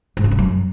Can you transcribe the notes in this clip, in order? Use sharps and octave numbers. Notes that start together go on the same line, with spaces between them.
G#2
C#3
A2
F#2